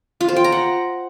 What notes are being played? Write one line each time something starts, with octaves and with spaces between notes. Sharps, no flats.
F4
C5
G5
A#5
F#5